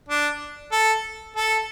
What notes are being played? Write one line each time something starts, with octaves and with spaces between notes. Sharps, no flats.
D4
A4
A4